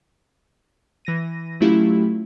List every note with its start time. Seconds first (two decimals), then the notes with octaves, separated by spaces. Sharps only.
1.05 E3 A#6 D#7
1.60 F#3 A3 C#4 E4 F4 G4